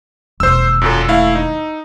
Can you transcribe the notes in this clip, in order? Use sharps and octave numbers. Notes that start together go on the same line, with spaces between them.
E1 D#2 C5 E6
F#2 A#2 A4
A3 E4 F5
D#4